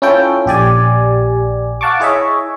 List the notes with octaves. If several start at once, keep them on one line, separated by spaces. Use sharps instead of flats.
C#4 E4 F4 A4 G5
A#1 G4 D5 G#5
F5 F#5 A5 C#6 D6
E4 G#4 C#5 D#5 E5